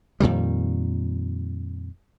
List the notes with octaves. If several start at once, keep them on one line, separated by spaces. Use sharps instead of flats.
F2 A#2 D#3 G3